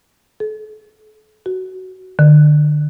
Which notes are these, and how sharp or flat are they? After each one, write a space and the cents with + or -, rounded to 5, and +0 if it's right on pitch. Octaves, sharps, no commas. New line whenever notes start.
A4 -40
F#4 +15
D3 +30